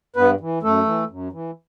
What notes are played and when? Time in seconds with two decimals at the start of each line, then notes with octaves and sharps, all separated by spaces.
0.16 G2 B3 B4
0.40 E3
0.62 F#2 A3 A4
0.86 E3
1.10 F#2
1.32 E3